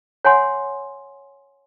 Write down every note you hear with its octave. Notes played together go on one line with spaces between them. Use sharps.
C#5 F#5 G#5 C6